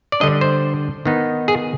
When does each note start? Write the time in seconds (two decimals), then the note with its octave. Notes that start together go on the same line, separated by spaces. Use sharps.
0.12 D5
0.20 D3 G3 D4 D#5
0.41 C5
1.06 D#3 B3 D#4
1.48 G#4